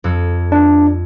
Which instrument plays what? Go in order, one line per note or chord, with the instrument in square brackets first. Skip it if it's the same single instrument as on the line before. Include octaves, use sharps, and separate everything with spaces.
[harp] F2 A4 E6
[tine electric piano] D4